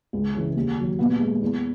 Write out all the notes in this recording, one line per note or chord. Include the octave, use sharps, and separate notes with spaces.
C#2
C#3 E3
D#2
D#3 F#3
A#2 B3
G#3
E2